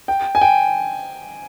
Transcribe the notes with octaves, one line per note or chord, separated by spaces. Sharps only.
G5
G#5
G5